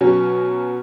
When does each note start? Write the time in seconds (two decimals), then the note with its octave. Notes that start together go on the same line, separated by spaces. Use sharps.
0.01 B2 F#3 C#4